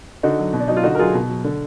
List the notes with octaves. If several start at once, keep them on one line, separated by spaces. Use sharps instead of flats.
D3 D#4 F#4
F#3
B2
D4
F#3 D#4
F4
D3 D#4 F#4
A#4
F#3 F4 G#4
B2
F#3
D3